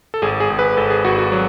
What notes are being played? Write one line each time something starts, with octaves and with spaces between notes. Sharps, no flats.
A4
G#1 G#4
G#4
G#1
B4
G#1 A4
G#4
G#1 F#4
F#4
F#3